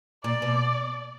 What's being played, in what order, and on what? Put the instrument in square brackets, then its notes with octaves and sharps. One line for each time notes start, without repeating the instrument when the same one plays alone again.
[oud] A#2 [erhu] D5
[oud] B2